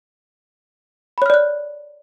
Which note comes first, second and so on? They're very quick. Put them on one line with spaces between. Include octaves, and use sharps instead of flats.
B5 C#5 F6 D5 F#6